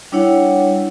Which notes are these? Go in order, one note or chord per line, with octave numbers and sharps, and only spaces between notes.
G3 D4 E4 C#5 F#5